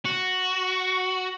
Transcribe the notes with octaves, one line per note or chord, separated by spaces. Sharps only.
F#4